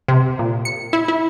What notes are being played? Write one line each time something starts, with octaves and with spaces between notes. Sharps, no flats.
C3
A#2
C#7
E4
E4